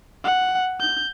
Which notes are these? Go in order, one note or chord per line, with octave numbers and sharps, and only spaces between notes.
F#5
G6